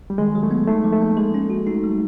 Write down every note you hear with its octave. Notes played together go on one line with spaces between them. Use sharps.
G3
D#3 G#3
F#3
A3
B3
A3 D#4
F3
A3
A#3
G#3 A4
C#4
F#4
A3 D#4
G3